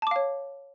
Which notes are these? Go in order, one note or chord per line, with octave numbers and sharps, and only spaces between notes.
C#5 F5 A5 D6